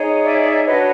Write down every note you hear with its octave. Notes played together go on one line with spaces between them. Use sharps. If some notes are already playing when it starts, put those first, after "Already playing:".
Already playing: D#4 G#4 C#5
D5 E5
D4 F#4 B4 C#5 D#5